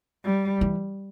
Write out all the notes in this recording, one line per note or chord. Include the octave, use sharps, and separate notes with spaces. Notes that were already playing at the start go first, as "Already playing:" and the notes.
G3
E3